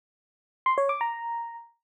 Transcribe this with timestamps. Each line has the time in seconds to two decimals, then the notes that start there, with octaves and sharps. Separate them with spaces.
0.66 C6
0.78 C#5
0.89 D6
1.01 A#5